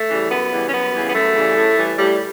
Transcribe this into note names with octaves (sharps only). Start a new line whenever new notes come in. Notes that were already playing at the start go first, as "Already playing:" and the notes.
Already playing: A3
C#3 E3 G3
F#2 B3
C#3 E3 G3
C#4
F#2 B3
C#3 E3 G3
B3
F#2 A3
C#3 E3 G3
A2
E3 G3
A2 G3